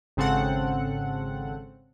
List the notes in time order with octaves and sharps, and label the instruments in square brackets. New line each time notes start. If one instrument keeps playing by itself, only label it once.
[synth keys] G#1 C#3 C4 A4 F#5